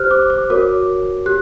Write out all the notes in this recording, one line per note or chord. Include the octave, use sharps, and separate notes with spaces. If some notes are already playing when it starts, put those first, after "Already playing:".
Already playing: G4 C5 F6 F#6
D6
D6
F#4 A#4 C#5 D6
G4 F#6